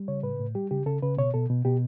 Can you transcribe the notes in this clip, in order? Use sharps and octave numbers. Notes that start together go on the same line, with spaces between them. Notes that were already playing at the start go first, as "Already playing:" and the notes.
Already playing: G3
C#3 C#5
A2 B4
A2
G3 G4
C#3 G4
C#3 A4
C#3 B4
B2 C#5
B2 A4
B2
B2 G4